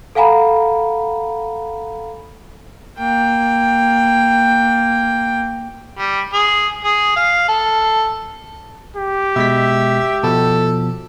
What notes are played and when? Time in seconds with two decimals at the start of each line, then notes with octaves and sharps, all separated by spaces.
0.15 A4 F5 F#5 G#5 A#5 B5
2.98 A#3 G5
5.99 G3
6.33 G#4
6.84 G#4
7.16 F5
7.48 A4
8.96 G4
9.36 B2 G#3 E5 B6
10.23 B2 F3 A4